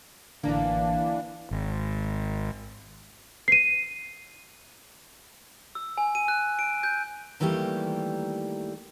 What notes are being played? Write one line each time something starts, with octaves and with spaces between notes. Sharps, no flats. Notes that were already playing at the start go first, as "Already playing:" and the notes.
A1 D3 E3 A#3 D4
G#1
C7 D#7
E6
G#5
D#7
F#6
D7
G6
D#3 E3 G3 A3 A#3 G4